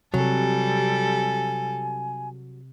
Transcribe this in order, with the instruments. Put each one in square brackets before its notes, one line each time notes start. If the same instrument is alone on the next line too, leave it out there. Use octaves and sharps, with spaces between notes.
[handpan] C3 [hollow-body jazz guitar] F#3 [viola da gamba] G3 A4 [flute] G#5